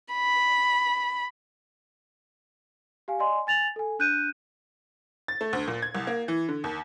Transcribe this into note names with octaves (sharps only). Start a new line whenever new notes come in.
B5
G4 F5 G#5
D5 D#5 G#5 C6
G#5 A6 F7 F#7
A4 G#5
D4 F#6 G6 D#7
A6
A3
D2
A#2
G#6
C2
A#3
E3
D3
D#2